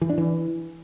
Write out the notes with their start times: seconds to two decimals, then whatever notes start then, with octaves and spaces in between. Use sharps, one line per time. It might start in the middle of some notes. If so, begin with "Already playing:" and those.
0.01 E3
0.10 D4
0.18 E3